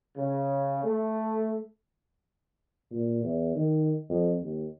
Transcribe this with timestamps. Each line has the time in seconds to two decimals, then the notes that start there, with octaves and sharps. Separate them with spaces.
0.17 C#3
0.84 A3
2.92 A#2
3.23 E2
3.56 D#3
4.09 F2
4.42 D#2